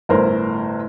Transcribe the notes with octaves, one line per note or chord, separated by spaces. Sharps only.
G1 A2 A#4 C5